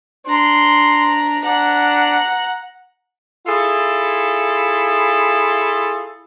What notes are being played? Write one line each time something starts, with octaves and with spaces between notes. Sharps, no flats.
D4 A#5 C6
D4 F#5 A#5
E4 F4 G#4 A4